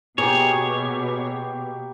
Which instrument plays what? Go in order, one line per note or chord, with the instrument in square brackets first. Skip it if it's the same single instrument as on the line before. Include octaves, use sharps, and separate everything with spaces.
[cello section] B2 [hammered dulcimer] A#3 B3 G4 [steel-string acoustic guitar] G#4 [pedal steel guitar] C#5